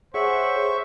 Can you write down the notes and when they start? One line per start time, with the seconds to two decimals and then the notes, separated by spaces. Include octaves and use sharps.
0.14 G#4 C5 C#5 E5 F#5 C#6